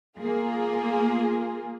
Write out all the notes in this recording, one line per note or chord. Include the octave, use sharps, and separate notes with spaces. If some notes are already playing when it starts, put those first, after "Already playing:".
A#3 F4 G#4